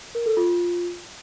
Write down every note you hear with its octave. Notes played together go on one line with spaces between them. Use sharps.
A#4
A4
F4